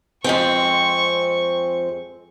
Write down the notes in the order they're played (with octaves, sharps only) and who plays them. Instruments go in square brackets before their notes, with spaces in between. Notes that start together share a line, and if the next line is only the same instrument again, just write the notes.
[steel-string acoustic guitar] F2 G#3 C4 [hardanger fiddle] C#6